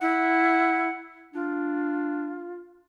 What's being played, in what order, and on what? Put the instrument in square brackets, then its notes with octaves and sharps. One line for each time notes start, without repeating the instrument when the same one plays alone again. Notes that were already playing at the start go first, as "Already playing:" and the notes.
[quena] E4 [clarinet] F#5
[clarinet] D4 [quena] F4